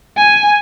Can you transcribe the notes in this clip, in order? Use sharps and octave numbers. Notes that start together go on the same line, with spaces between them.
G#5